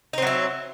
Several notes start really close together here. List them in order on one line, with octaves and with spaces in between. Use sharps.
D#4 C4 F#3 E4